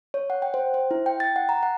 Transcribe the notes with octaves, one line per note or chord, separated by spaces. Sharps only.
C#5
F#5
G5
C5
C5
E4
G5
A6
F#5
A#5
F#5